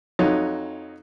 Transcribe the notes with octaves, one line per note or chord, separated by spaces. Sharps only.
F2 F#3 D#4